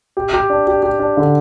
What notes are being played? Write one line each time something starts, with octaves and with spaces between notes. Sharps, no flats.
G4
G4
D4
G4
G4
D4
D3